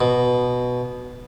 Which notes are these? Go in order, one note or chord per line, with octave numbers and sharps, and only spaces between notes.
B2